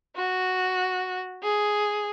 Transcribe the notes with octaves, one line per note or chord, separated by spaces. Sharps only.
F#4
G#4